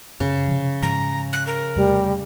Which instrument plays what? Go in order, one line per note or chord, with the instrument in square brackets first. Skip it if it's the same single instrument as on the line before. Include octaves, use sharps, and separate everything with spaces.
[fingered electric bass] F#2 [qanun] C#3
[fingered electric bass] C3 F3
[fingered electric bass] G#2 F3 [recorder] A#5
[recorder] F#6
A#4
[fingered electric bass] E2 C3 A3 [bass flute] G3